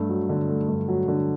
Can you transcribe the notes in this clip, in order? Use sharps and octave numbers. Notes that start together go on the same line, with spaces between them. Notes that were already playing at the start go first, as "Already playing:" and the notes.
Already playing: G2 A3
F#3
D3
A3
G2
F#3
D3